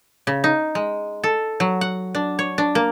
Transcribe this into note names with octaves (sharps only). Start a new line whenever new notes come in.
C#3
D#4
G#3
A4
F#3
F#5
D4
C#5
D4
A#3